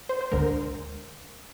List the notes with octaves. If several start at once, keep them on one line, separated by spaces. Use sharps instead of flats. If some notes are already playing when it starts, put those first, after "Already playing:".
C5
C5
D2 D3 G#3 A#4